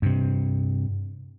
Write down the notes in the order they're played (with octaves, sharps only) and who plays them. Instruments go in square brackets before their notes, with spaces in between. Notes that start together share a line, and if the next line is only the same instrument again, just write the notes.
[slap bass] G2 C3